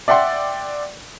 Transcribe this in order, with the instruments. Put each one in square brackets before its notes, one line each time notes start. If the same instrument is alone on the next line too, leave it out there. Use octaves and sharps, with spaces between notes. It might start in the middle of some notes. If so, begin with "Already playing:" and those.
[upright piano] D5 E5 F#5 G5 C6